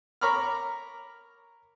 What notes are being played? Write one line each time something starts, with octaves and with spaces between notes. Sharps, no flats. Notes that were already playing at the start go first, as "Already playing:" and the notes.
A#4 C#5 A#5 B5 D6 F6